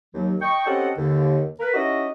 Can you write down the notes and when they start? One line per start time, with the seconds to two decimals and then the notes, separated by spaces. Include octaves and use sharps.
0.14 D#2 F#3
0.42 D#5 G5 C#6
0.66 C4 C#4 G4 A4 D#5 F#5
0.97 D#2 D3
1.60 A#4 B4
1.74 C#4 D#4 E4 F#4 G4 D#5